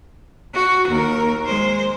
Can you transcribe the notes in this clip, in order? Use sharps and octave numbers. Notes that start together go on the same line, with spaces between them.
F#4
D#2 A#4
G#3 C5